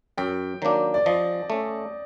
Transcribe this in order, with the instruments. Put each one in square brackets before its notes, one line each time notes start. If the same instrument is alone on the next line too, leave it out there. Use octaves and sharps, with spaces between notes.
[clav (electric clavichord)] F#2 [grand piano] G5
[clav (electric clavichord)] D#3 F#3 A#3 D4
[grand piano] D5
[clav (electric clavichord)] F3 [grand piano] D#5
[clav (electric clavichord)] A3 C#4